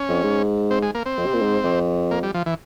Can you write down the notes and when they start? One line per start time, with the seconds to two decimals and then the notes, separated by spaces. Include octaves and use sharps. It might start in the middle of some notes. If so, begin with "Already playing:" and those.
Already playing: C#4
0.09 F2
0.23 G#2
0.71 C4
0.83 G#3
0.95 A#3
1.06 C4
1.18 F2
1.26 C3
1.34 A#2
1.42 G#2
1.64 F2
2.11 A#3
2.23 G3
2.34 F3
2.46 E3